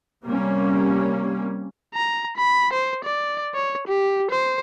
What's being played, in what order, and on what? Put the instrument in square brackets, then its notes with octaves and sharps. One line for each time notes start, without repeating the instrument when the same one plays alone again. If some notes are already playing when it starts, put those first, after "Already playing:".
[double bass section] C3 G3 A#3 C#4
[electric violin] A#5
B5
C5
D5
C#5
G4
C5